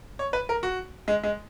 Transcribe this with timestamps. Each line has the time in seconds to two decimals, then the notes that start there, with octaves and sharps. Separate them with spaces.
0.19 C#5
0.33 B4
0.49 A#4
0.63 F#4
1.08 G#3
1.23 G#3